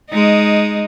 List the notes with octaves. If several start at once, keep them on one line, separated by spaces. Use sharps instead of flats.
G#3 D#4